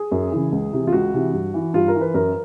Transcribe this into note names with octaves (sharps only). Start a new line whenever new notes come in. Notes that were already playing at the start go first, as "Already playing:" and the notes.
Already playing: G#4
F#2
C#3 E3
C#2
C3 E3
F4
C#2 F#4
C3 E3
G2
E3
G2 F4
A#4
E3
B4
F#2 A#4